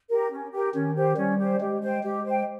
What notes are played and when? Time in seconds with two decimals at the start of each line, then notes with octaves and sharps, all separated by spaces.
0.09 G4 A#4
0.30 C#4
0.52 G4 A#4
0.74 D#3 C#4
0.96 G4 C5
1.16 G3 C#4
1.39 G4 C5
1.61 G#3 G4
1.82 C5 G5
2.03 G#3 G4
2.25 C5 G5